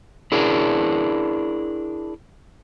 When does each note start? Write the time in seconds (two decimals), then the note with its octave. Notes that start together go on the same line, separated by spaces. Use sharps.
0.32 D4 E4 G#4 A#4